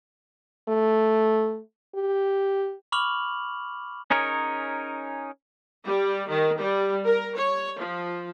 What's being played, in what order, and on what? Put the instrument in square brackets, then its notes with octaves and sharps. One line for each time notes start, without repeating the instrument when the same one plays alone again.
[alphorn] A3
G4
[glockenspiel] B5 C#6 D6 F6 F7 F#7
[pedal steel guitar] C#4 D#4 G#4 A#4 C#5
[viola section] G3
D#3
G3
A#4
C#5
F3